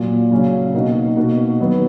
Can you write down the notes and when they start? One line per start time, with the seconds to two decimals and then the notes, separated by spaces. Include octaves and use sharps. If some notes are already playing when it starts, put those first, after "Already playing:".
Already playing: A#2 F#3 A#3
0.31 C#3 F#3 C#4
0.74 B2 A#3 D#4 F#4
1.17 B2 A#3 D#4 F#4
1.60 D#3 F#3 B3